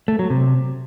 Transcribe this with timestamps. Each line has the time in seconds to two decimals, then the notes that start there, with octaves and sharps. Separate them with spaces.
0.08 A3
0.19 F#3
0.30 C3